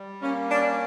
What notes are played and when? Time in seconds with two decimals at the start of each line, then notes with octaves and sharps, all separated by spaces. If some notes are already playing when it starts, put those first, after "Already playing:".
Already playing: G3
0.22 A#3 C#4
0.50 C#4 D4